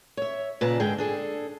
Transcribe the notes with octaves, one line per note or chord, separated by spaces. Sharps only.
C#5 E5
A#2 C#3 B4 D5 A5 A#5
G#2 D3 G#4 G5
D4 G#4 A4